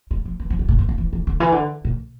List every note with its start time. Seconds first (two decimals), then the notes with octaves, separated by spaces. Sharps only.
0.11 G3
0.25 F3
0.40 E3
0.50 F3
0.59 G3
0.69 A2
0.79 G2
0.89 D3
0.98 E3
1.13 E3
1.27 D3
1.40 E3
1.52 D3
1.85 A#2